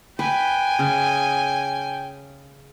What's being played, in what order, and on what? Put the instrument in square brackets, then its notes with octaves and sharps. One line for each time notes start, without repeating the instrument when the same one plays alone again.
[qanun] B4 [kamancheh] G5 G#5
[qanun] C#3